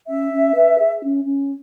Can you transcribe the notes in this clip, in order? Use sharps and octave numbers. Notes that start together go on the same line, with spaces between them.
C#4 E5
C#4
B4
G#4
C#4
C#4